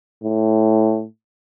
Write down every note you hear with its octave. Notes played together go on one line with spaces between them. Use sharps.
A2